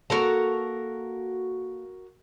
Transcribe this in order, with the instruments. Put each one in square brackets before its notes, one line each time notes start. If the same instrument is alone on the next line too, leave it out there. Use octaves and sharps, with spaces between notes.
[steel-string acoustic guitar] A#3 A4 A5 [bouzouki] F#4 A#4 A#5